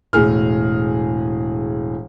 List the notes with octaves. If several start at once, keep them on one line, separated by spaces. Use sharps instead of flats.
E1 A2 G#4 F6